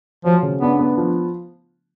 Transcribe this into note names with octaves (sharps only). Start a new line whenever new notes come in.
F3 F#3
C#3
B3 D4
B3
F3